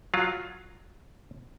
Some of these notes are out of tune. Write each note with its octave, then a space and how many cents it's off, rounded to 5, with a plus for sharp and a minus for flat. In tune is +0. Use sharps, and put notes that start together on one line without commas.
F#3 -5 F4 +0 F5 +25